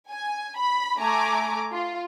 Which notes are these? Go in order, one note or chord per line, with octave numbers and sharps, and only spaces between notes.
G#5
B5
A3 G#5 A#5 D6
F4